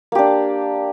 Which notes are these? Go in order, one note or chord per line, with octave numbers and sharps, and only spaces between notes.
A#3 D4 G4